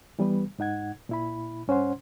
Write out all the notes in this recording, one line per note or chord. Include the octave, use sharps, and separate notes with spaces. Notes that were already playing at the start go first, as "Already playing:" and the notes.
E3 G3 B3 B4
G#2 D#4 F#5 G#6
A#2 E4 B5
G2 C#4 C5 F#5 C6